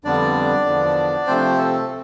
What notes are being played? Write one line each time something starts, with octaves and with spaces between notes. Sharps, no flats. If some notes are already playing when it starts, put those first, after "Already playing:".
F2 D3 G3 B3 D4 D5
E2 D3 F3 B3
C3 F3 A3 C4 C5
A3 A4
C4